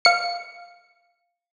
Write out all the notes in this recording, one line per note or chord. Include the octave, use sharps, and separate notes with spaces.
F5 C#7